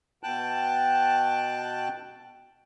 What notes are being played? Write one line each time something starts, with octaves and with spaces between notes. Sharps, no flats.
B2 G5 A5 F#6